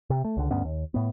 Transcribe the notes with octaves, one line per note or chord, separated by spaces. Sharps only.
C3
A3
C#2 D3
D2 G2 B3 C#4
D#2
A2 B3